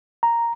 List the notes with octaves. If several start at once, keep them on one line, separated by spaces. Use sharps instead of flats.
A#5